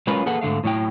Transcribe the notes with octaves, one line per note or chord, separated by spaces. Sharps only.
F#3 G#3 C#4 F4 A#4 B4
A#3 G#4 A4 B4 F#5
G#2 D3 A3 F5
A2 F#3 E4 G5